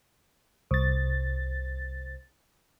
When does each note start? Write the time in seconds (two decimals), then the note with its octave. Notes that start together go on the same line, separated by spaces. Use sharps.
0.71 C2 A6